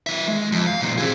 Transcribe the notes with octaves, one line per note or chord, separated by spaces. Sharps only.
D#3 E5
G#3
F2
F5
A#2 D#3
C4 G#4